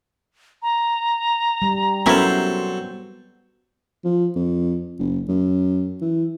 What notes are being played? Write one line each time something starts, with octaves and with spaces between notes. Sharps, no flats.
A#5
G3
F#3 B3 C#4 E4 A4 A#4 C5
F3
F2
F#1
F#2
E3